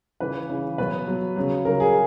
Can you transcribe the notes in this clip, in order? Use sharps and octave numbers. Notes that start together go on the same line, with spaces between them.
C#3 E3 B4
C#3 E3
B2 F#3 B4
B2 F#3
C#3 F#3
C#3 F#3 A#4
G#4